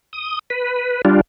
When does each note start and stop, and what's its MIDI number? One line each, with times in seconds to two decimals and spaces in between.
0.13 0.39 87
0.50 1.02 71
1.05 1.21 55
1.05 1.21 62
1.05 1.21 65